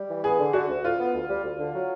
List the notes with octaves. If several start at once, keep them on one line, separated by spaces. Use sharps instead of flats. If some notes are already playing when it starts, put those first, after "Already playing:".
Already playing: G3
E3
B3 G#4
D3
D3 F#4
D2
D2 F4
B3
D2
G3
D2
D3
F#3